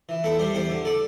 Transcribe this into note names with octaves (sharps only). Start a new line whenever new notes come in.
E3
E2 E4 A4
G3 G4 C5
E2 G4 C5
D3
A4 D5